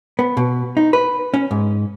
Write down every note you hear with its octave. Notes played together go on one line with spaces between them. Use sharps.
B3
B2
D#4
B4
C#4
G#2